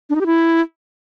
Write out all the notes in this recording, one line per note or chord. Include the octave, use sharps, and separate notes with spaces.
D4
D#4
G4
E4